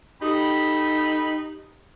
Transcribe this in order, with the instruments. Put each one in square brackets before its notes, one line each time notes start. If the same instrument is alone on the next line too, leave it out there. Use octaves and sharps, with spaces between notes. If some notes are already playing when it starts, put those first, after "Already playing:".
[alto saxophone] D#4 [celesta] G4 D#6 [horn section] A4 G5 B5